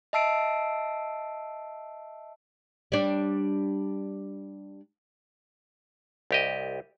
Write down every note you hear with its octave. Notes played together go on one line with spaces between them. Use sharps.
D#5 E5 A5 E6 C7 D7
G3 D4
C2 G4 D#5